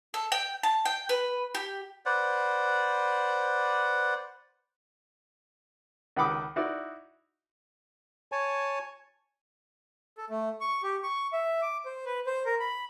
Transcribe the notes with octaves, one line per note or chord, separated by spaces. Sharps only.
A4
G5
A5
G5
B4
G4
B4 C5 D5 F#5
C#2 D#3 F#5 B5 D6 D#6
D#4 E4 F#4 D5
C#5 G#5 A5
A4
A3
C#6
G4
C#6
E5
D6
C5
B4
C5
A#4
B5